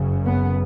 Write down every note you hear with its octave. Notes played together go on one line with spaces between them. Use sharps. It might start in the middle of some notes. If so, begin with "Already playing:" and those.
Already playing: F#1 F#2 C#3
B3